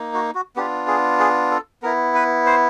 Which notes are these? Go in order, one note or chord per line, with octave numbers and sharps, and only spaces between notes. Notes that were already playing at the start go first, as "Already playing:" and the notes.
Already playing: A#3 D#4
F#4
F#4
B3 D4 F4 G4
G#4
G#4
A4
B3 E4 A#4
B4
C5